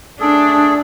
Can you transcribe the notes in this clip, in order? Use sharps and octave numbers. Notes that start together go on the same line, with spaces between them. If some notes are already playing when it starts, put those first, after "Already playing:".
A3 D4 G#4 A4